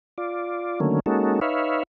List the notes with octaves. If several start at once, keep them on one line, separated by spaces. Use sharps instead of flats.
F4 D5
D3 D#3 F#3 A3 A#3 C#4
G#3 A#3 C#4 D#4 F#4 A4
D#4 B4 C#5 E5 F5